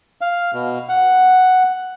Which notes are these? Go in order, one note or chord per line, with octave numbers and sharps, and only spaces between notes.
F5
B2
F#5